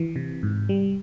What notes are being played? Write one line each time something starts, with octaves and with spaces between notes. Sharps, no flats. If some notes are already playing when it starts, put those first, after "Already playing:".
Already playing: E3
C3
G#2
G3